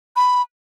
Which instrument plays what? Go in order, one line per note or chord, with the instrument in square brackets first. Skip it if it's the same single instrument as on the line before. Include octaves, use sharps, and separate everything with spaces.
[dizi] B5